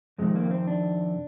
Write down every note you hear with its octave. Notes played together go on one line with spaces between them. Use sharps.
F2 C3 D#3 G#3
A#3
C4
D4